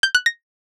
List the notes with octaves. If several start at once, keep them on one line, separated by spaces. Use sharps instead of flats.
G6
F#6
A#6